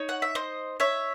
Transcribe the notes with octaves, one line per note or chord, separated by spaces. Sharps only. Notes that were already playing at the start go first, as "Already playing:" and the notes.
Already playing: D#4 C#5
F#5
E5
C5 D#5
C#5 E5